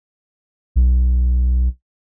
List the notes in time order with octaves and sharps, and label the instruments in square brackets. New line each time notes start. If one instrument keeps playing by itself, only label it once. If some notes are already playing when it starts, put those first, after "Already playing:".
[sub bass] B1